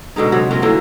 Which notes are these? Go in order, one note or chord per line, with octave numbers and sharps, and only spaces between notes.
B2 D3 G#3 D#4
C3 F#3
F#3 A#3 C#4 F4
D3 E3 F#3 A#3